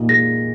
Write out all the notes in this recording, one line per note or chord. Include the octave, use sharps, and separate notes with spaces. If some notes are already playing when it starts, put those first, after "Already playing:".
Already playing: A#2 D#4
G#3 A#6